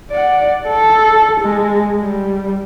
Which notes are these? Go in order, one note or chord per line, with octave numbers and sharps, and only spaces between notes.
D5 F#5
A4
G#3
G3